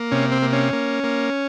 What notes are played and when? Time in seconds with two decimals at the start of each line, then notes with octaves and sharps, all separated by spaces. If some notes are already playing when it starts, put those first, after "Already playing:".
Already playing: A#3
0.11 C3 C#4
0.32 C4
0.42 A#3
0.53 C#4
0.73 A#3
1.04 A#3